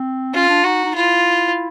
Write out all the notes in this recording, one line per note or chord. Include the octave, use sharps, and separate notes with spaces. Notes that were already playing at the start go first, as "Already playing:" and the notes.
Already playing: C4
C#4 F4
D4
D#4 F#4
D#4
E4 F4